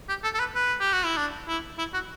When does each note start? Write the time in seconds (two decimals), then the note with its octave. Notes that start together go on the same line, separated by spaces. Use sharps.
0.09 G4
0.24 A4
0.34 A4
0.40 B4
0.55 B4
0.80 G4
0.93 F#4
1.05 E4
1.17 D4
1.48 E4
1.79 E4
1.94 F#4